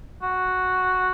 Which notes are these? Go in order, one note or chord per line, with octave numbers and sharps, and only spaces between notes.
F#4